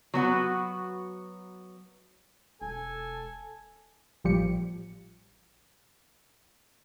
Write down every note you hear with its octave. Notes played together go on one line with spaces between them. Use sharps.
F#3 B3 F#4 B4
E1 A4 G#5
A1 A#2 F3 G3 G4 C#7